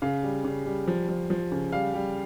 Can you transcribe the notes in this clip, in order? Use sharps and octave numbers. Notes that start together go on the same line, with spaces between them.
C#3 F5
G3
C#3
G3
F3
F3
F3
C#3
G3 F5
G3